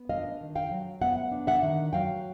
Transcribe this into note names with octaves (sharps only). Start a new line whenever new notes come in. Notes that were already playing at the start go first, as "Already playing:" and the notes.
Already playing: B3
D4 D#5 F5
D#3
F5 G5
F#3
B3 E5 F#5
D4
E5 F#5
D#3
F#3 F5 G5